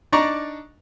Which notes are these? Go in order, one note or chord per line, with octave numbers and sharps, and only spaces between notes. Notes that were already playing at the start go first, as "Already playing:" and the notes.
D4 D#4 D5 A#5 C#6